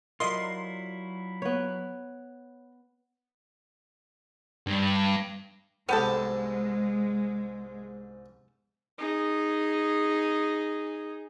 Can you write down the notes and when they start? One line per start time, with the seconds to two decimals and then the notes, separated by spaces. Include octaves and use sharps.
0.20 F#3 E4 F4 A#4 D5 D#5 C6
1.42 B3 C#5
4.67 G2
5.89 C2 G#2 G#3 B3 G4 A4
8.98 D#4 G#4